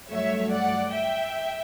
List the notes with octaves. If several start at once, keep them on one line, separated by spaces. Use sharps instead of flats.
G2 F#3 A3 C#5 E5
D5 F#5
E5 G5